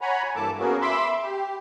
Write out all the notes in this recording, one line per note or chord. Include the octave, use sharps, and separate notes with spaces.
C#5 F#5 G#5 A#5 B5
G2 E3 A#3 A4 A5 D6
A#3 B3 C#4 F#4 G#4 A#4
E5 B5 C6 D6 E6
G4